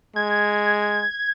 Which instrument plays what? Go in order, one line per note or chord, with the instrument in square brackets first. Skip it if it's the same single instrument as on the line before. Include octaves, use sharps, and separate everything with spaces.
[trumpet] G#3 [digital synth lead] G#6